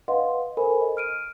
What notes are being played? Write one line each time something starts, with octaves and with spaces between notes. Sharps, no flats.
B4 D#5 F5 F#5 C6
A4 A#4 C5 G#5 B5
D#5
F6 D7 D#7